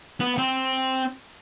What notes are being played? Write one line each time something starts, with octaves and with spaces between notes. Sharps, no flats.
B3
C4